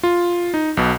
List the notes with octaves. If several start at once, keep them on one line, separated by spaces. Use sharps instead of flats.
F4
D#4
B1 B2